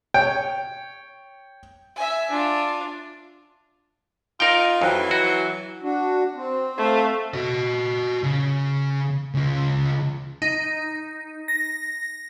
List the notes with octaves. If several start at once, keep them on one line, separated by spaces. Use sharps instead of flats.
C#5 G5
E5 G#5
D4 F4
D#4 F4 A#4 G5
F2 E3 F#3
F#4
D4 F#4
C4
A3 F5
F#4 D#5
C#3
C#3 F4
D#4
A#6